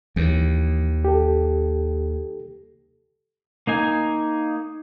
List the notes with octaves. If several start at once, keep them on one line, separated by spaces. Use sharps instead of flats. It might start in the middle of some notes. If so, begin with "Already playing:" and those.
D#2 E3
G4 A4
A#3 D#4 G#5